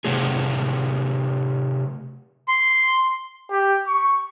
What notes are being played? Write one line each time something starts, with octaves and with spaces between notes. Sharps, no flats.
C3 F#3 A3 G#4
C6
G4
C#6